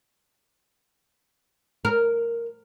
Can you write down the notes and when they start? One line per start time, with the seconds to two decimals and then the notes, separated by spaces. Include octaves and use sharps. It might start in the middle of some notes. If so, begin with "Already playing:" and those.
1.85 A#4